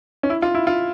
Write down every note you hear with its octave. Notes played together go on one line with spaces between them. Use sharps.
C#4
E4
F4
E4
F4